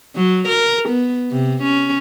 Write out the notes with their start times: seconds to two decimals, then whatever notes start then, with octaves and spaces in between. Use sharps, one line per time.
0.16 F#3
0.48 A#4
0.89 B3
1.31 C3
1.63 C#4